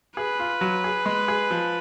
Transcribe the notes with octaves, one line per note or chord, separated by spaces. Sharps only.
G#4 B4
F4
F#3
G#4
G#3
G#4
F3